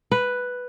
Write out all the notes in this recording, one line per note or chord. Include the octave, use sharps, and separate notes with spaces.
B4